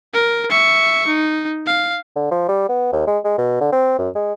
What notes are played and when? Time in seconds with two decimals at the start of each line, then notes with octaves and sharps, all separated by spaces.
0.13 A#4
0.50 E5 C#6
1.07 D#4
1.66 F5
2.16 D3
2.31 F3
2.49 G3
2.69 B3
2.92 D#2
3.07 G#3
3.24 G#3
3.38 B2
3.61 D3
3.72 C4
3.98 F#2
4.15 G#3